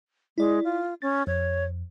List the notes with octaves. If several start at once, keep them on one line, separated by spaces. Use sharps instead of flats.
G#3 E4 D5
F4
C#4 A6
F2 C#5